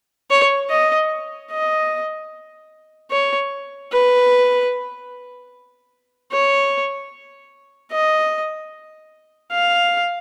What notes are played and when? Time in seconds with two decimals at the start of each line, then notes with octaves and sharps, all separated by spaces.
0.31 C#5
0.70 D#5
1.51 D#5
3.11 C#5
3.92 B4
6.32 C#5
7.92 D#5
9.52 F5